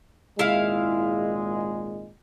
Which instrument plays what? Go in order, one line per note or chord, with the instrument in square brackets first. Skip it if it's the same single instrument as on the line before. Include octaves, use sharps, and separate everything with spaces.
[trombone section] G#1 A#2 G#3 [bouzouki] E4 F5